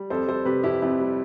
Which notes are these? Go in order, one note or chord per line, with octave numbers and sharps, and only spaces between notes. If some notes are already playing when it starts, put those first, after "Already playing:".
Already playing: G3
F2 A4 C5
G3 A4 C5
C3 G4 B4
F2 E4 G4
F2 C4 E4
G3